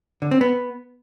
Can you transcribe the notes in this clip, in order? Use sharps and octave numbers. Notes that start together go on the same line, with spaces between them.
D3
C4
B3